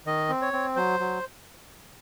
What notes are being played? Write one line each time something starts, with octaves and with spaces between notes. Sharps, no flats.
D#3 D#5
C4
C#5
C4
F#3 C5
F#3